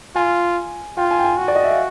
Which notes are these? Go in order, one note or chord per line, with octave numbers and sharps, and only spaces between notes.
F4 G#5
F4 G5
G#5
G5
G#5
F#4
D5
D#5
E5
F5